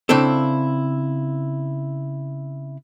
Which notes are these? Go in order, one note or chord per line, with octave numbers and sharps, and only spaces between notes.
C#3 C4 D4 E4 A4